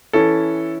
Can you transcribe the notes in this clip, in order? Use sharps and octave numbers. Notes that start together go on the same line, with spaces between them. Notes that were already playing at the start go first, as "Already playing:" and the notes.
E3 C#4 E4 A4